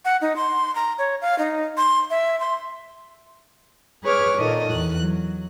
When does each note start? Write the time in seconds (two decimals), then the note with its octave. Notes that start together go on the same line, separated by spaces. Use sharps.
0.05 F#5
0.21 D#4
0.36 C6
0.75 A#5
0.98 C#5
1.21 F5
1.39 D#4
1.77 C6
2.10 E5
2.40 C6
4.03 G#4 B4 C#5 D6 F6
4.38 A#2 D#3 A4 D#5
4.71 E2 F#6
5.01 F#3